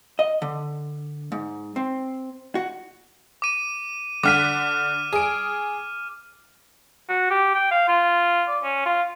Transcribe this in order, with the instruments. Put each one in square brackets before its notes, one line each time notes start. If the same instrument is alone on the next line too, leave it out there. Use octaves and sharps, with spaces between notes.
[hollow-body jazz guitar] D#5
D3
G#2
C4
F#4
[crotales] D6 D#7
[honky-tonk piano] D3 F#5 B6 [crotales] D6 F6 D#7
[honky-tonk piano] G#4 D7
[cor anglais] F#4
G4
G5
F5
F4
D5
C#4
F4